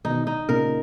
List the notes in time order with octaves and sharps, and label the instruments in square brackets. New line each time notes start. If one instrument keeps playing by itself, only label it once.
[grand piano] B2 D#3 [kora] D#4
[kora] D#4
[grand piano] A#2 C#3 [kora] A#4